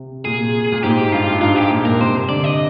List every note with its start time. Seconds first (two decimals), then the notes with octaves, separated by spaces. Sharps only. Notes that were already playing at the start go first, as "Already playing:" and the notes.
Already playing: C3
0.25 A#2 G#4
0.72 A#2
0.83 G#2 G4
1.12 G2 F4
1.31 G2
1.42 G#2 F4
1.56 G4
1.71 A#2
1.85 A#4
2.00 C3 C5
2.29 D3 D5
2.44 D#5